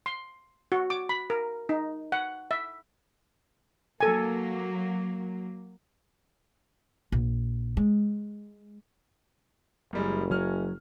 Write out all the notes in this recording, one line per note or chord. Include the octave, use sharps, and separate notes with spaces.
C6
F#4
D6
B5
A#4
D#4
F#5
E5
F#3 A#3 A4 G#5
A#1
G#3
F#1 F#2 G3 G#3
F#3 C#4 F6